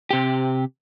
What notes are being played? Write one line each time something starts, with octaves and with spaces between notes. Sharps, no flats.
C3 G4